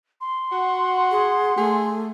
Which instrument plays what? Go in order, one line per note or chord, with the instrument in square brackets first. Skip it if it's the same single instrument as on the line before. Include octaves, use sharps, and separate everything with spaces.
[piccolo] C6
[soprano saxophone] F#4 [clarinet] F#5
[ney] G#4
[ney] A3 [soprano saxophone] G#4